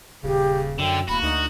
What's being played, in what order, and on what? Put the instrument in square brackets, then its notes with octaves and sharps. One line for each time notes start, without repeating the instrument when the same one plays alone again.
[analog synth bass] D#1 [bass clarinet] C#3 [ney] G4
[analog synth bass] F#2 [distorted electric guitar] D3 [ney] G5
[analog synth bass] D1 [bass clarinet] A#3 [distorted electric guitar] F#4 [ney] B5
[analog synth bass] D2 [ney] D#4